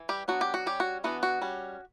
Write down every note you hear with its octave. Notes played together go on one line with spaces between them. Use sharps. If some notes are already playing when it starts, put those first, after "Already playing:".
Already playing: E3
G3 G4
F#3 B3 D4 F#4
G4
F#4
G3 C#4 G4
F#4
E3 B3 D4 F#4
F#4
G3 C#4